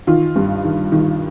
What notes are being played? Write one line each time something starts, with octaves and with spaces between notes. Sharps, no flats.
D#3 F4
G2
D#3
D#3